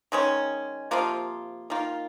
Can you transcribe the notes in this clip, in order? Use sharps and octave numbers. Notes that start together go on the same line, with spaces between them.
D#3 G#3 C#4
C3 F3 A#3 F4
D#3 A#3 F4